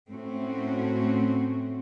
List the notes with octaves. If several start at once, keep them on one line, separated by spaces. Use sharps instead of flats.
A2 A3 C4 C#4 F#4